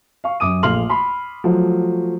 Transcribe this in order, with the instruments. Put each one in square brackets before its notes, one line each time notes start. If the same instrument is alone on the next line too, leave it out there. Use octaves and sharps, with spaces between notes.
[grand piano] F5 C#6
F#2 D6 D#6 D#7
A#1 A3 F5 C6 F6 F#7
B5 C6
F3 F#3 A3 F#4